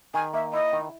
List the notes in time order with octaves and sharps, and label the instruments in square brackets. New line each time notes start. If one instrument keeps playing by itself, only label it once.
[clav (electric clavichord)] D#3 [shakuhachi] G#5
[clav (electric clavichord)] A#3 [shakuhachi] E5
[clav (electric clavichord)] E4 [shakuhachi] D#5
[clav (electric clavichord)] D#3